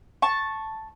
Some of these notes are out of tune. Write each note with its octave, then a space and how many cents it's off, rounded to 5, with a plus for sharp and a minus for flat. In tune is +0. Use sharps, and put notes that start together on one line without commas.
A5 +0 C#6 -10